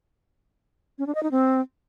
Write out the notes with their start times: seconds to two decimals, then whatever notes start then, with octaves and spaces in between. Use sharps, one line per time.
0.99 C#4
1.07 D4
1.15 D#5
1.23 D#4
1.31 C4